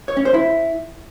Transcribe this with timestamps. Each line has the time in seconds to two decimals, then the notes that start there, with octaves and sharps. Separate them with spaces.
0.08 C#5
0.17 C#4
0.25 C5
0.34 E4